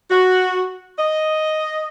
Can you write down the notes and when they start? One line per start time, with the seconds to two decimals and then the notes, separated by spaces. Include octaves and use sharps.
0.10 F#4
0.98 D#5